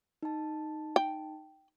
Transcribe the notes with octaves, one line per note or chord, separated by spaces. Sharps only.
D#4 A5
G5